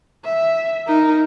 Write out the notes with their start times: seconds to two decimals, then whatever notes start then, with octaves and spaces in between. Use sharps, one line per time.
0.25 E5
0.87 D#4 A#4